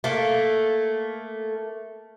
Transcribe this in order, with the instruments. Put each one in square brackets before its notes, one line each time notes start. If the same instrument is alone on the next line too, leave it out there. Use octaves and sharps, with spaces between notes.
[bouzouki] A3 A#3